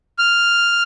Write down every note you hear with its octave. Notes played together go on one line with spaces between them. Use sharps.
F6